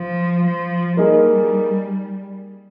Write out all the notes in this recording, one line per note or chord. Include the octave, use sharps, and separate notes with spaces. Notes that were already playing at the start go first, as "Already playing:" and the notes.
Already playing: F3
F3
G3 A#3 D#4 G#4